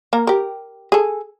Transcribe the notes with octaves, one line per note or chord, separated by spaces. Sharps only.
A#3 A#4
G4 A#4
G#4 A4